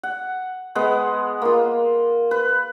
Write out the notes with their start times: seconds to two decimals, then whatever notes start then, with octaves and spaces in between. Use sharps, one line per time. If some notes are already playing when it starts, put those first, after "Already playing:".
0.03 F#5
0.75 G#3 B3 F#5
1.42 A#3 F4
2.31 B4